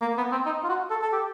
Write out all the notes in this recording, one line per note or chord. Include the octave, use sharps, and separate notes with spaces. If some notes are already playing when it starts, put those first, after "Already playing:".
A#3
B3
C4
D#4
F4
F#4
A4
A4
G4